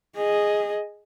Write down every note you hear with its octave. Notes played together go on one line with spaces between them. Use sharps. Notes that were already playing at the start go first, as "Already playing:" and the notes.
G#4 D#5